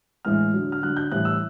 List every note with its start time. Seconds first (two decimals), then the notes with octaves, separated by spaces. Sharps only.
0.25 A2 E3 G#3 F6
0.54 D3 F#3
0.72 F6
0.82 D3 F#3 F#6
0.97 G6
1.11 A2 E3 G3 F#6
1.25 E6